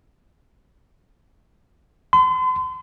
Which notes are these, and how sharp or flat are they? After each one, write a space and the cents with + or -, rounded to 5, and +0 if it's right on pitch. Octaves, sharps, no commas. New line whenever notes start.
C6 -45